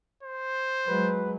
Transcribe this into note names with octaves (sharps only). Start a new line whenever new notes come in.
C5
F#3 G#3 B4